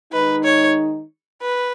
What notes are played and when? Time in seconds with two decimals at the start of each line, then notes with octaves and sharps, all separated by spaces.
0.12 D#3 G#3 D#4 B4
0.44 C#5
1.41 B4